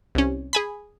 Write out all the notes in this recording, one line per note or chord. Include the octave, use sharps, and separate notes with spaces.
C2 C#4
G#4 G#5 B5